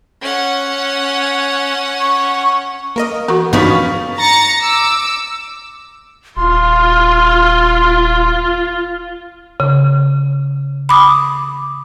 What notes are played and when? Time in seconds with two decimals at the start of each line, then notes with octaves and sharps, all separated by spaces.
0.21 C#4 F#5
2.01 C#6
2.96 A#3 A#4 D#5
3.28 E3 B3 F#4
3.53 G2 F3 B3 C#4 D#4 B4
4.16 A#5 A6 A#6 C#7
4.60 D6 E6
6.37 D#1 F4 C6
9.60 C#3
10.89 B5 D6 D#6